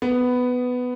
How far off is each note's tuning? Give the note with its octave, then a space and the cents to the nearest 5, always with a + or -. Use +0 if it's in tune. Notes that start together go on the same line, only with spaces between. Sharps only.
B3 +10